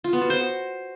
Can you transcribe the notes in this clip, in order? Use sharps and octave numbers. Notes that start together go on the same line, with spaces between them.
F4
B3
F#4
C5